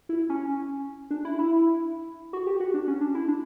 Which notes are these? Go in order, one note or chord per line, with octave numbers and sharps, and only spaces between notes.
E4
C#4
D4
E4
E4
F#4
G4
F#4
D4
C#4
D4
E4
D4